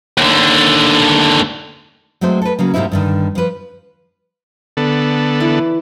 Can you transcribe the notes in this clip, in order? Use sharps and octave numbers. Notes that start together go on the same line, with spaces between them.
D#2 D3
F#3 G#3 A3 C4 C5
A4 B4
C#3 F#3 A#3
G#2 C3 A#3 C4 D#4 E4
G2 D3 D#3
F3 B4
D3 B3 A4
E3